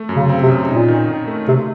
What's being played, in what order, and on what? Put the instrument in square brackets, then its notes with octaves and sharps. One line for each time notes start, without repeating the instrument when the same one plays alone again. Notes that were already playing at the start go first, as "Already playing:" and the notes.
Already playing: [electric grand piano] A3
F#2
[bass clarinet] C#3
[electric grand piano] C4
[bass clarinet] C3
[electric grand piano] C#3
[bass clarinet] A#2 [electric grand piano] D#4
[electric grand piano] D#3
D#3
A3
[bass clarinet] C3 [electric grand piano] A3